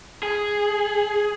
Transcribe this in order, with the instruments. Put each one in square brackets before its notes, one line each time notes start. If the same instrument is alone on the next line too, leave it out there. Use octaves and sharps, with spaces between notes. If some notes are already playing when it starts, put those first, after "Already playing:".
[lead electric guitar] G#4